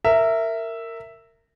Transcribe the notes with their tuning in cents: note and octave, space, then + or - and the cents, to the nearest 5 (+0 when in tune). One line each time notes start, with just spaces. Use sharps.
A#4 -20 E5 +0